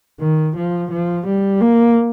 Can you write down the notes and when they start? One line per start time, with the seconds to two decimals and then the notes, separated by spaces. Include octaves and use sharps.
0.21 D#3
0.56 F3
0.91 F3
1.26 G3
1.61 A#3